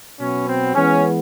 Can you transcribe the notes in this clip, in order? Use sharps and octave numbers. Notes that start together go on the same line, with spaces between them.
B2 F#3 B3 C#4
C4
E3 G#3 B3 C#4